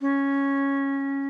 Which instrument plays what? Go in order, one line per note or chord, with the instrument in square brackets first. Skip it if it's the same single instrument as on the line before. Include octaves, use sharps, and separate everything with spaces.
[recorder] C#4